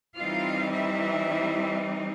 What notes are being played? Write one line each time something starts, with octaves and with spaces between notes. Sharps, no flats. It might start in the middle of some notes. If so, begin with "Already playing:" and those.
E3 G3 C4 D#4 F4 F5
E4 E5